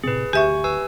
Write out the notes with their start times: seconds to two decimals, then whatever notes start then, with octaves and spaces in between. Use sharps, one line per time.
0.04 A2 C3 C4 G#4 B4
0.33 D2 G4 E5 G#5 C#6
0.64 B4 G#5 E6